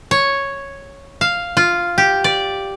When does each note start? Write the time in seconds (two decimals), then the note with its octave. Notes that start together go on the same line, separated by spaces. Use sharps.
0.11 C#5
1.21 F5
1.57 F4
1.98 G4
2.24 D5